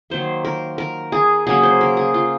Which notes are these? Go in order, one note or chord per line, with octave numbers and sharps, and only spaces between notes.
D#3 F#3 A#3 C5
A#4
A#4
G#4
C#3 F#3 A#3 G#4
C5
A#4
G#4
F4